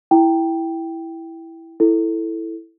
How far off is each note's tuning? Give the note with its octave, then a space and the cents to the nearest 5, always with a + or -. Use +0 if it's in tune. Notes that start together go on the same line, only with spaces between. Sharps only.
E4 +0 G5 +0
E4 +0 A4 +0